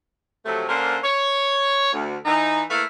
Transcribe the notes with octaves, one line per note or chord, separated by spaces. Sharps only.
C3 F3 F#3 A3
D3 A#3 C#4 D4 C5
C#5
D2
E3 D#4
A3 A#3 E4 B4 E5 F5